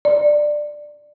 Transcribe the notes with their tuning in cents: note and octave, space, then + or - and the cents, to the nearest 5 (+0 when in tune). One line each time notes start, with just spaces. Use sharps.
D5 +15